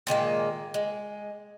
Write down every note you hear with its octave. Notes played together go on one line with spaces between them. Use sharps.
A#2 D#3 G#3 A#3
G#3